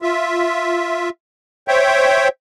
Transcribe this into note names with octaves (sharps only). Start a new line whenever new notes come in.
F4 E5
C5 C#5 E5 G5